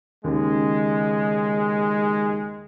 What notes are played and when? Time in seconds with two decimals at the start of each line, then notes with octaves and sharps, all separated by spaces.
0.24 D#2 C#3 G#3